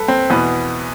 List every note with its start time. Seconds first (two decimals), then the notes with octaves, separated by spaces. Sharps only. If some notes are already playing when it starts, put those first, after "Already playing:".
Already playing: G2 A4 B4
0.08 C4
0.30 E2 B2 B3